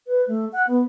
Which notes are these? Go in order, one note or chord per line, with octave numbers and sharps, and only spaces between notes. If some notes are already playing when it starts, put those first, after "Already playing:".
B4
A3
F#5
B3